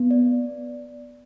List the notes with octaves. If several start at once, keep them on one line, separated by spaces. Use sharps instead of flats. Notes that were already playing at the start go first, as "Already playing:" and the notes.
Already playing: B3
D5